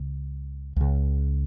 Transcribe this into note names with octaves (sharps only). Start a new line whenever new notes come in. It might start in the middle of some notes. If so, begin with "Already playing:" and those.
Already playing: C#2 C#3
C#2 C#3